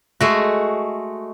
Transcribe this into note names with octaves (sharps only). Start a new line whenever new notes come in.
G#3 A3 F#4